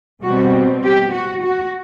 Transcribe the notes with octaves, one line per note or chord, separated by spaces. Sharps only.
B2 G3 C4 F#4
G4
F#4
F#4